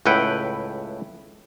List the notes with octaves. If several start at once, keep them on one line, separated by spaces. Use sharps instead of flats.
C#2 A2 E4 B4 F#5 G5